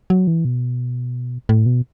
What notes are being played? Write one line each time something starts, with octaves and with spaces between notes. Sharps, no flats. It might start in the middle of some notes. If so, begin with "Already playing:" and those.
F#3
E3
B2
A2
B2